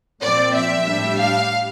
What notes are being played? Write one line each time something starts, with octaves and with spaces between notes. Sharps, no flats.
A#2 F3 C4 D5
E5
A2 G3 D4
F5